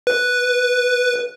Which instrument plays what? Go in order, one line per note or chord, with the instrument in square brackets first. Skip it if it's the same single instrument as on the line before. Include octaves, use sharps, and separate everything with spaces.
[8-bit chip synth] B4